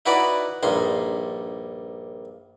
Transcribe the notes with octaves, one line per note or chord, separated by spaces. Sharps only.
D#4 E4 F#4 B4 D5
A#1 G2 D#4 C6